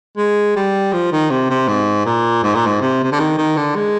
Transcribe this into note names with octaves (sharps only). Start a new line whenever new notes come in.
G#3
G3
F3
D#3
C3
C3
G#2
A#2
G#2
A#2
G#2
C3
C3
D3
D#3
D#3
D3
G#3